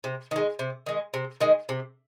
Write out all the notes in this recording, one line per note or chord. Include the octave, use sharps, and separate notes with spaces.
C3
D#3 G#3
C3
D#3 G#3
C3
D#3 G#3
C3